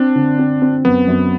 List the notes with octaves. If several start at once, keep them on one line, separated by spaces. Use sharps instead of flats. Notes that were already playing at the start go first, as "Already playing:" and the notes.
Already playing: C4 D4
D3
C4
C4
F#2 B3
F#2